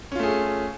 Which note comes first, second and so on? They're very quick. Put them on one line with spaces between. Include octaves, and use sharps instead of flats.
C#4 F4 A3 G#4